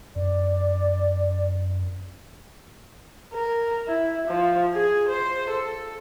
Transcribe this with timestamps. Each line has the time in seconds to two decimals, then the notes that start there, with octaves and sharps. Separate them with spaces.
0.16 F#2 D5
3.34 A#4
3.87 E4
4.28 F3
4.74 G#4
5.09 C5
5.50 A4